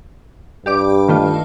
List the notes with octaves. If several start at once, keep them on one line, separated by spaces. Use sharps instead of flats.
G2 G4 D5 D6
D#3 A3 F4